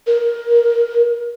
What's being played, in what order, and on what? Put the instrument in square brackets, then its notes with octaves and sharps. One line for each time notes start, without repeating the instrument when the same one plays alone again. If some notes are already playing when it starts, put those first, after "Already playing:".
[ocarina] A#4